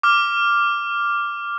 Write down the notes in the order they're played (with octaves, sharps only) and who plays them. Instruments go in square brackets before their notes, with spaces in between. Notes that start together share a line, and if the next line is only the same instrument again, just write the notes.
[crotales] D6 F6